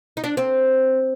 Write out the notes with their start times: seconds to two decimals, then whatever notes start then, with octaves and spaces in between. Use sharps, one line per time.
0.17 D#4
0.24 D4
0.37 C4